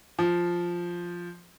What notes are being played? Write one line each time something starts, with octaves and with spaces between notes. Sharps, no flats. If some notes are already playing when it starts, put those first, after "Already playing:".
F3